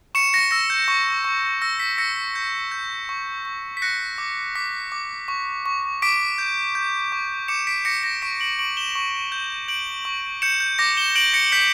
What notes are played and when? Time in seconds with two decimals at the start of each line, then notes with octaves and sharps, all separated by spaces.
0.15 C#6 C#7 E7
0.33 A#6 C#7
0.51 E6 A#6
0.70 G6
0.88 C#6
1.24 C#6
1.62 E6 A#6
1.80 B6
1.98 E6 A#6 C#7
2.16 B6
2.35 G6
2.72 G6
3.09 C#6
3.45 C#6
3.77 B6
3.82 F#6 A#6 C#7
4.18 D6
4.55 D6 B6
4.92 D6
5.28 C#6
5.66 C#6
6.02 D6 B6 D7
6.38 G6
6.75 G6
7.12 C#6
7.48 D6 C#7 E7
7.67 B6 D7
7.85 D6 A#6 C#7
8.04 A#6 C#7
8.22 C#6 B6 D7
8.40 D7 F#7
8.59 C#6 D7 F#7
8.77 E7 G7
8.95 C#6
9.32 G6
9.68 G6 D7 F#7
10.05 C#6
10.42 G6 C#7 E7
10.60 G6
10.79 D6 A#6
10.97 E7 G7
11.15 G6 D7 F#7
11.34 A#6 C#7
11.52 G6 B6